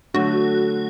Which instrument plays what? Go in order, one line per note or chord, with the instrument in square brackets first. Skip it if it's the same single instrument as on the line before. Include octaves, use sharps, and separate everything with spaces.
[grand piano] D3 F#3 A3 [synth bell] F#4